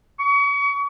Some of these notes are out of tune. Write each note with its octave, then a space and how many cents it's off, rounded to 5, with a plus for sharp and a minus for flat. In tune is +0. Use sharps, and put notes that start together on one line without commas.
C#6 +35